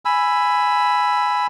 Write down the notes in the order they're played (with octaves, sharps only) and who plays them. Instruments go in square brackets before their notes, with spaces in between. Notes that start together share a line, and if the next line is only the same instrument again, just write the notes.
[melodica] G#5 B5 E6